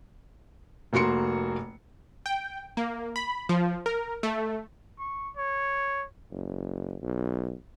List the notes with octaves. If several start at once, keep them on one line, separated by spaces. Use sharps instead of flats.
F1 A#3 F#4 C6 C#7
G5
A#3
B5
F3
A#4
A3
C#6
C#5
F#1
B1